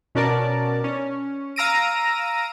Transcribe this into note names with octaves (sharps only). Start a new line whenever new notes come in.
B2 C#4 F#4 A#4 D5 A5
C#4
F5 A#5 E6 A#6 D7 D#7